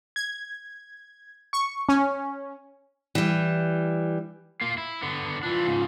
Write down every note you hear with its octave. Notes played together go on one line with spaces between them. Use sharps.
G#6
C#6
C#4
E3 G3
A#3 F4
E4
D3 B3
E3 D4 F4
G#2 C#3